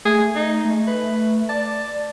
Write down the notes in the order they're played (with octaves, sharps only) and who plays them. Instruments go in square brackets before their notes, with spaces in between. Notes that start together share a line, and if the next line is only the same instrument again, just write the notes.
[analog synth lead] A3 [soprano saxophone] G#4
[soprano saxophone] D#4
[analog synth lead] A3
[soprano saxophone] B4
[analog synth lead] D5 [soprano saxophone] A5